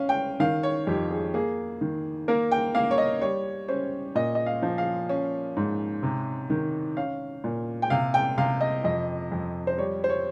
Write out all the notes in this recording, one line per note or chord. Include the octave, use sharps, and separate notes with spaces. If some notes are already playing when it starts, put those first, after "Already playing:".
Already playing: C#4 F5
G5
D#3 F5
C#5
F2 G4
G#4
A#3 G#4
D#3
A#3 A#4
G5
A#3 F5
C#5
D#5
G3 C#5
C#4 C5
A#2 D#5
D#5
F5
F3
F5
C#4
G#2
C3
D#3
C#4 F5
A#2
G5
C3 F5
G5
C3 F5
D#5
F2 D#5
F2
C5
G3 C#5
C5
C#5